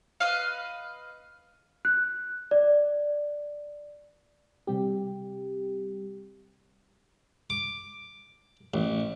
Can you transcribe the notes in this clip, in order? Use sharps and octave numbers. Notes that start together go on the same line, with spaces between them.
B4 D#5 F5
F#6
D5
C3 G3 C4 G4
D6
A1